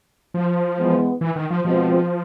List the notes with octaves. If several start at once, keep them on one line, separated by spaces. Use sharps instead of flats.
F3
E3 G#3 B3
E3
D#3
F3
B2 F3 G#3 C4 F4